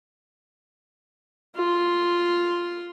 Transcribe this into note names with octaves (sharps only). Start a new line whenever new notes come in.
F4 C6